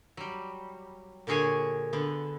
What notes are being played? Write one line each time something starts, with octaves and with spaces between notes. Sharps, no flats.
F#3 G3
A#2 D3 F#4 G#4 C#5 G#5
D3 B3